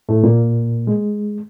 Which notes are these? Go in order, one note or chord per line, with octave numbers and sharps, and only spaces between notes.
A2 A3
A#2 A#3
G#3